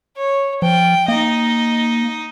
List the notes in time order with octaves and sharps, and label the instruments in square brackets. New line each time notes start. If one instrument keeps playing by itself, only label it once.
[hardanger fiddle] C#5
[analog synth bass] F3 [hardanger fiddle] G5
[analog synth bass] A#3 [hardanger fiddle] D#4 D#5